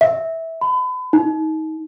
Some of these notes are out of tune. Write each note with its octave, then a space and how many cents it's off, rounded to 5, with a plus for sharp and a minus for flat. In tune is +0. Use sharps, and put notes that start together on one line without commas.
E5 -15
B5 +35
D#4 +25